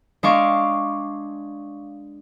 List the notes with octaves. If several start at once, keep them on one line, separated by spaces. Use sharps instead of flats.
G#3 D4 F5 C#6 D6